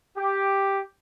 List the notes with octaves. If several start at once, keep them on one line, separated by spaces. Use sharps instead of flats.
G4